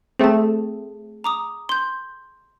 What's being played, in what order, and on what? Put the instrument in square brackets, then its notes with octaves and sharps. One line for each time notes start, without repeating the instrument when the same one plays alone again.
[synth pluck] A3 C4 [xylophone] G#4 A5
[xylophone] A#5 D6 D#6
C6 G6